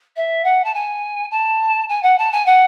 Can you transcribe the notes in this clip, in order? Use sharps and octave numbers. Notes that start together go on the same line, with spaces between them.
E5
F#5
A5
G#5
A5
G#5
F#5
A5
G#5
F#5